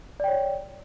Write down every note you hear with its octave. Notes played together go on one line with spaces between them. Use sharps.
C#5 D5 G5